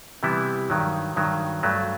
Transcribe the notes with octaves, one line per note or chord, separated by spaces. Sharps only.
C3 E3 G3 B3 E4
G2 D#3 F#3
G2 D#3 F#3
G2 F#3 A3